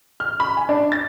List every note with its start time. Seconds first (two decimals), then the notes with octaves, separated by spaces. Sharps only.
0.20 F6
0.40 B5
0.57 G#5
0.69 D4
0.92 A6